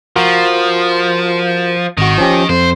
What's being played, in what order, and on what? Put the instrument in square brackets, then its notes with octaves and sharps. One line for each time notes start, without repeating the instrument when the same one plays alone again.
[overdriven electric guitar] F3 [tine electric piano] F4 F#4 A#4
[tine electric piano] G#1 F#4 [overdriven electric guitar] D#3
[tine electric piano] F3 C#4 G4
[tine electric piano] F2 [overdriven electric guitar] C5